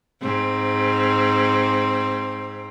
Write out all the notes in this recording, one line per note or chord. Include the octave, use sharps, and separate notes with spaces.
G#2 C4